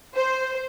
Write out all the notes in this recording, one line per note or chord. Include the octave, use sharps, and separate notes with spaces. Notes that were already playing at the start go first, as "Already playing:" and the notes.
C5